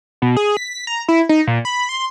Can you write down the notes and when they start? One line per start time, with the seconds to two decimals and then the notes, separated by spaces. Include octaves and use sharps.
0.22 B2
0.37 G#4
0.57 B6
0.87 A#5
1.09 E4
1.29 D#4
1.47 A#2
1.65 B5
1.89 C6